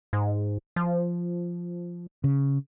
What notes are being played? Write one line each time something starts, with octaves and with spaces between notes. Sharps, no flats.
G#2
F3
C#3